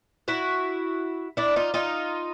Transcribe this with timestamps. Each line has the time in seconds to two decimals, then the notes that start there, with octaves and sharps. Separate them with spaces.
0.28 E4 F#4
1.37 D4 E4
1.56 D#4 F4
1.74 D#4 F4